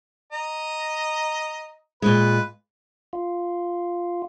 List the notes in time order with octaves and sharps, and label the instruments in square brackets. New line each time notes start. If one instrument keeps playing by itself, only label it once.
[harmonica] D#5 A#5
[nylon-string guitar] A#2 G#3 [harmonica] B4
[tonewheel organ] F4